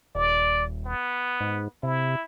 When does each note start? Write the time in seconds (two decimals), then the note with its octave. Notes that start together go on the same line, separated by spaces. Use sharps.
0.15 D#1 D5
0.86 B3
1.41 G#2
1.83 C3 E4